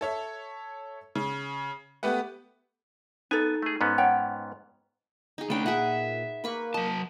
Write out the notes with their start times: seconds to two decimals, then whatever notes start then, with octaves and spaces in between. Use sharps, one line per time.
0.01 A4 C#5 E5
1.15 C#3
2.03 A3 B3 G4 B4 F#5
3.31 B3 D#4 A4 G#5
3.62 A3 G#4
3.81 G#2 B3 C#4
3.98 C#5 F#5 G5
5.38 D#4 G#4
5.50 C#3 A3 D4 B4 G5
5.66 A#2 G#4 E5 F#5
6.44 A#3 B4 B5 C#6
6.74 F#3 D#5 A5